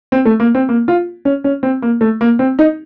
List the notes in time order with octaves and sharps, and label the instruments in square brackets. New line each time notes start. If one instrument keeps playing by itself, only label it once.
[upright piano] C4
A3
A#3
C4
A#3
F4
C#4
C#4
C4
A#3
A3
A#3
C4
D#4